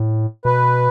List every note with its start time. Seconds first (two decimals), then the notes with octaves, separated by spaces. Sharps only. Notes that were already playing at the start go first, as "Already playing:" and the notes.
Already playing: A2
0.45 B2 B4